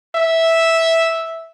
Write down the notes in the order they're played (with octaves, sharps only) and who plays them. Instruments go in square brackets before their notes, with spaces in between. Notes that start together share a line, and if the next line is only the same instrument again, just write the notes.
[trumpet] E5